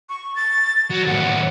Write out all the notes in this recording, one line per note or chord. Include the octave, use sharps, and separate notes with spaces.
C#6
A6
F#3
D#2 A2 F#5